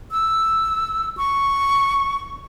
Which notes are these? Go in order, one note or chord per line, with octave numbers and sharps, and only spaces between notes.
E6
C#6